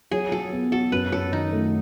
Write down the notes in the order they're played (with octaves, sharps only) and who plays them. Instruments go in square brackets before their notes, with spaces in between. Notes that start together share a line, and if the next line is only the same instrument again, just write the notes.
[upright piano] F#3 [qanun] G#4
[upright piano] F#3 [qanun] A4
[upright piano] B3
[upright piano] F#4 [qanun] A4
[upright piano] F#2 [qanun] B4
[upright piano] F#2 [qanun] A4
[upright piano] D#3 [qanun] D#4
[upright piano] A3